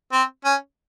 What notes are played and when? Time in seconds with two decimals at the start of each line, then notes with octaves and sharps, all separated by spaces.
0.12 C4
0.44 C#4